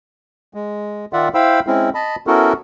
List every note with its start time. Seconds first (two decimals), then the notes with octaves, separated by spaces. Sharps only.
0.54 G#3
1.13 D#3 F4 D5 E5 F#5
1.34 E4 C5 F5 G5 B5 E6
1.67 G#3 C4 C#4 E4
1.95 D#5 A5 B5
2.27 B3 C#4 E4 F#4 A4 A#4